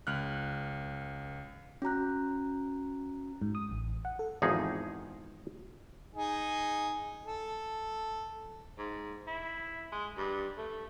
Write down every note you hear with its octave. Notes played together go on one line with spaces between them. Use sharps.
C#2 F6 F#6
C#4 F#4 A#5 F#6
G#2
D#6
A1
F#5
A4
G#1 E2 F3 D#4 G#4
D#4 G#4
A4
G#2
E4
G#3
G2
A3